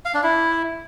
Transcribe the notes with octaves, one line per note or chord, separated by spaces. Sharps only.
F5
D4
E4